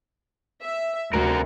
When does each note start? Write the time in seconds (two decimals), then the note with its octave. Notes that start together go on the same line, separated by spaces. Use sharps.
0.63 E5
1.14 D2 C3 F#4 A#4